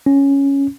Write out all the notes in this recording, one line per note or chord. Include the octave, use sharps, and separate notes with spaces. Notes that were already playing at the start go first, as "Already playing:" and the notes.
C#4